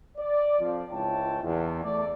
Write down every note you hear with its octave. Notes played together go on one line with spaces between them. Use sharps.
D5
F2 F3
C#2 G#2 E4 C#5 G5 A5
E2
A3 D5